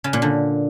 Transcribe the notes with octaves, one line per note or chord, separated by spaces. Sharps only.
C#3
A#2
D3